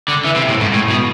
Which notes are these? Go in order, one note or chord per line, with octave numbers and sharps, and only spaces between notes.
D3
E3
C3
A2
G#2
A2
B2